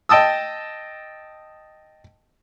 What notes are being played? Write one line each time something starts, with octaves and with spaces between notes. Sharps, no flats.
D#5 G5 A5 D#6 E6